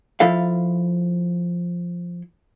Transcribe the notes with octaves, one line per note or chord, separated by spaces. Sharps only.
F3 E4 A4 F5